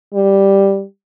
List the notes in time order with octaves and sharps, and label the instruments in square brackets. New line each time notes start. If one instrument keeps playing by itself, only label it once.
[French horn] G3